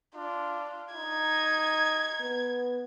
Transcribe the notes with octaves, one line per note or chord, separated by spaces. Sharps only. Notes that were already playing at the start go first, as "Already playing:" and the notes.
D4 F4
D#4 G#6
B3